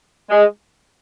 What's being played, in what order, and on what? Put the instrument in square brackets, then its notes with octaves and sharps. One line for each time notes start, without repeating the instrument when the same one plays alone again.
[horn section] G#3